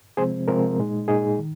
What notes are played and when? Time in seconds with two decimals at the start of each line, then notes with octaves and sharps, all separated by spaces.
0.17 C3 F3 G#3 C4 G#4 C5
0.48 C3 F3 G#3 C4 A#4
0.78 A#2 G#3 D#4
1.08 A#2 G#3 D#4 G#4
1.39 D#3